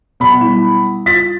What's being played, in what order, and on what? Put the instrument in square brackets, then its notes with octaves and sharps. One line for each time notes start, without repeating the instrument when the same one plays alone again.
[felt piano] B1 B5
[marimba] G3 E4
[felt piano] F4 A6 B6